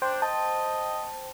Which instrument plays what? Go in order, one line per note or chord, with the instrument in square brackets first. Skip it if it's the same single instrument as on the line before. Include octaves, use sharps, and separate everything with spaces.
[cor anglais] D4 [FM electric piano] C5 G5
[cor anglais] D#5 [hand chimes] A5